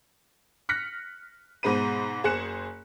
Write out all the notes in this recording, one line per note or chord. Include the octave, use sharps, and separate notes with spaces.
F6 F#6 A#6 B6 C#7
G#2 B2 G#3 C5 B5 D#7
F#1 G#4 C5 F#6 C#7 E7